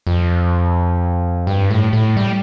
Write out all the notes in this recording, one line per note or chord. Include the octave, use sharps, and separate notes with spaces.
F2
G2
A2
A2
G3